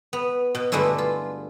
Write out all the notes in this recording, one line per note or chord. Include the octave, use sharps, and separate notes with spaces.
B3
B2
G2 D3 G#3 A3 E4
F4